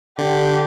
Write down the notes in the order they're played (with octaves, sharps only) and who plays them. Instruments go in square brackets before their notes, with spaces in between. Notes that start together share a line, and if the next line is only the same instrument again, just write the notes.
[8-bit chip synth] D3 [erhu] G4